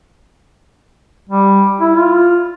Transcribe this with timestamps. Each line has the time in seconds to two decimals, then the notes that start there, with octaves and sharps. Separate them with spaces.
1.30 G3
1.80 E4
1.96 F4